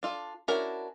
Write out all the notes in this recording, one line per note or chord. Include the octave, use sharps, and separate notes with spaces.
D4 F4 A4
C#4 D4 E4 F#4 A#4